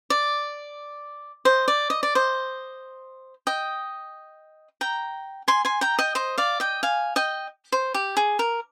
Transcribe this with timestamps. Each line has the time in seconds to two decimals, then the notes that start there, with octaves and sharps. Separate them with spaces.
0.10 D5
1.45 C5 D#5
1.68 D5
1.90 D#5
2.03 D5
2.15 C5 D#5
3.47 D#5 G5
4.81 G5 A#5
5.48 G#5 C6
5.65 G#5 C6
5.81 G5 A#5
5.99 D#5 G5
6.15 C5 D#5
6.38 D5 F5
6.60 D#5 G5
6.83 F5 G#5
7.16 D#5 G5
7.72 C5
7.94 G4
8.17 G#4
8.39 A#4